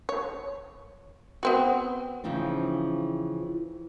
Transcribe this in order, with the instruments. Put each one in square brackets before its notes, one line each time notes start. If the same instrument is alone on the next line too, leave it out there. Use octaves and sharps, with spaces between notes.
[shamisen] C#5
B3 C4 F#4
[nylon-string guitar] C#3 E3 F3 C4 D#4